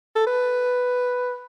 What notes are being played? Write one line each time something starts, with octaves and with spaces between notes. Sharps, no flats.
A4
B4